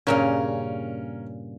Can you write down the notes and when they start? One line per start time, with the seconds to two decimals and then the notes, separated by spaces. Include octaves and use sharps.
0.07 G2 A#2 C#3 C#4 A#4